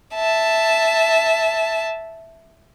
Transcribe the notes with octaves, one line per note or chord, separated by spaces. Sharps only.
E5 A5